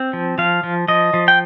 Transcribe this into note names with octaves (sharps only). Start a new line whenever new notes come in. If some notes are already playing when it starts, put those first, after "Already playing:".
Already playing: C4
F3
F3 F5
F3
F3 D#5
F3
G5